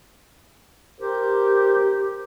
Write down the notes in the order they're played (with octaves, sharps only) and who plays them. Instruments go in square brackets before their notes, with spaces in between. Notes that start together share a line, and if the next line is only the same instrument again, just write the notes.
[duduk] G4 [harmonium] A#4 C5